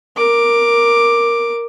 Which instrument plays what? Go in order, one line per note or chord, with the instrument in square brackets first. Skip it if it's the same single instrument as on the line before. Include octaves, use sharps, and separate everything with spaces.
[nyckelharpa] A#4 D6